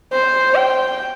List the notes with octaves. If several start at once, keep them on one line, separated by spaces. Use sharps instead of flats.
C5
G5